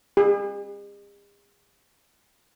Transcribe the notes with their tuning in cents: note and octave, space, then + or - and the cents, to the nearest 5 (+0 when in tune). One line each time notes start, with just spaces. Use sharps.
G#4 -45